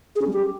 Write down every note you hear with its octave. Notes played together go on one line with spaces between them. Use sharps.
G#4
C#4
G3
G4